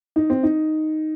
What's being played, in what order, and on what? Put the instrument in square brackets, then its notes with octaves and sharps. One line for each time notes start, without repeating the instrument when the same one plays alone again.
[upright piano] D#4
C4
D#4